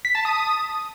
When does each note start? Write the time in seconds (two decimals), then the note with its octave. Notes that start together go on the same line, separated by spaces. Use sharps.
0.05 B6
0.15 A5
0.25 D#6